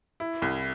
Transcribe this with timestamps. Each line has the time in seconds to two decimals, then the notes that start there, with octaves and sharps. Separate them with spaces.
0.20 E4
0.42 C2